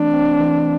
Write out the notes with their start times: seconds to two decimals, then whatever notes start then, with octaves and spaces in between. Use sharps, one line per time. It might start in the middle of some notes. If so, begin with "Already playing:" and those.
Already playing: E3 A3 C4 D4
0.13 C4
0.40 E3